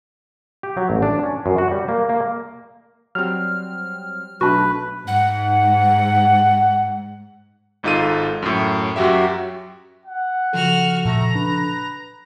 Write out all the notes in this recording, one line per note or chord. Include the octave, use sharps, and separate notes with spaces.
G4
F#3
A1
D4
C#4
F#2
F#4
G3
A#3
A#3
F#3 G3 C4 F6
B1 A3 D4 F#4 B4
G#2 F#5
G#1 G#2 D#4 F4 A4 D#7
F#2 A2
F#2 F#3 F#4 G4 E5
F#5
C#3 F3 F#4 A4 F6
A#2 A3 A#5
D4 B4